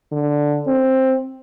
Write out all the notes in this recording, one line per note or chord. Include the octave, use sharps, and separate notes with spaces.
D3
C4